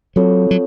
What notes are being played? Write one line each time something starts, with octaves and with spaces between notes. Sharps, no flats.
F#3 C4 F4 A4 C#5
F#3